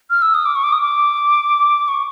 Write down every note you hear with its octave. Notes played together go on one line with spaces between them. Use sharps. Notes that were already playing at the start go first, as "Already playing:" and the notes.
F6
E6
D#6
D6
C#6
D6
D#6
D6
C#6